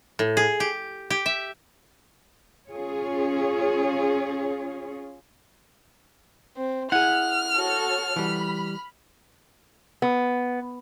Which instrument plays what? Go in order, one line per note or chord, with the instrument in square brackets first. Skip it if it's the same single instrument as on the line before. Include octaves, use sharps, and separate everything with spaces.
[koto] A2
G#4
G4
G4
E5
[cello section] C#4 F4 G#4 C#5
[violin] C4
[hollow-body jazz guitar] E4 G#4 [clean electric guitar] F#5 [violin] F6
[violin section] F#4 A4 C#5
[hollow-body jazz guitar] E3 G3 [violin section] B5
[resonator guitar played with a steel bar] B3